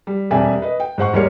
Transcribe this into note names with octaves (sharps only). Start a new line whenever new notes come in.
G3
E1 F2 G3 D5 E5 G#5
B4 D#5
G5
G#2 C5 F#5 C#6
D#2 G3 G#3 A#4 C#5 C#7